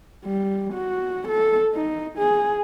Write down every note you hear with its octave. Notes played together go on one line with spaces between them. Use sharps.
G3
F#4
A4
D#4
G#4